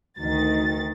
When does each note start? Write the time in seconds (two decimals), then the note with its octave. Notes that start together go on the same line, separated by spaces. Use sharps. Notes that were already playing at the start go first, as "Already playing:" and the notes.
0.19 D2 D#3 A6